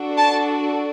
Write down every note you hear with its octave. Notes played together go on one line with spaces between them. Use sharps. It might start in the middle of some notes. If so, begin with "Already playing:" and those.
Already playing: D4 F#4 A4
A5